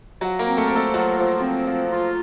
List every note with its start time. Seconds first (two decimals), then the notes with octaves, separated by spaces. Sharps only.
0.21 F3 F#3 F#4
0.39 A#3 A#4
0.46 C4
0.57 A3 A4
0.67 F3 A#4
0.76 A3 A4
0.94 F#3 F4 F#4
1.18 F3
1.42 C4
1.67 F3
1.91 F4